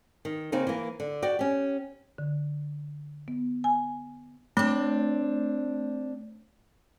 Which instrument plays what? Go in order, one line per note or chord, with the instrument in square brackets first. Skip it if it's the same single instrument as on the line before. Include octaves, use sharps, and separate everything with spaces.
[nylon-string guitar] D#3
C#3 A#3 C4 D#4
E3 A#3
D3
F#4 D5 G5
C#4 G4
[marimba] D3
B3
G#5
[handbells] A3 [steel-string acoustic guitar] C4 D4